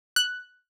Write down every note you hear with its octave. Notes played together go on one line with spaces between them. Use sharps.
F#6